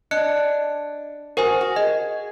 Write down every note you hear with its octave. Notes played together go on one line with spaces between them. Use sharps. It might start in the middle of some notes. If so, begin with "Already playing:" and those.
D4 D#5 F#6 C#7
F#4 A#4 C5 G#5
F#4
G#4 D#5